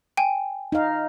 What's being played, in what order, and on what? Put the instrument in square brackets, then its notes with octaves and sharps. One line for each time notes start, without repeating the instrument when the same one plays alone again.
[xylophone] G5 G#5
[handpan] D#4 F5